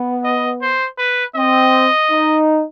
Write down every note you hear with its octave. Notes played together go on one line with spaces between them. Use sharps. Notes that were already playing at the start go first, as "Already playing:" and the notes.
Already playing: B3
D#5
C5
B4
C4 D#5
D#4